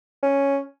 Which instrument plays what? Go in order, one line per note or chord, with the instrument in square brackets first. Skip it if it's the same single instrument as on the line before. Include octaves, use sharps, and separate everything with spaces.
[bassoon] C#4